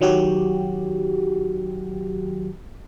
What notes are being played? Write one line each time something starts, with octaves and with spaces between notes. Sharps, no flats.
D#3 F#3 F#4 G4